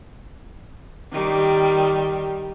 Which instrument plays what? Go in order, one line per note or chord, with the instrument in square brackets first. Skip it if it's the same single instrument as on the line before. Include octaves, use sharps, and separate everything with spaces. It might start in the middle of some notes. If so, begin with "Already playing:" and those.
[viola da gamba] D#3 G3